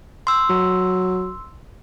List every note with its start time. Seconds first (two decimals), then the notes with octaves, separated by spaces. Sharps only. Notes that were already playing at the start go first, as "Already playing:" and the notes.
0.27 C6 E6
0.49 F#3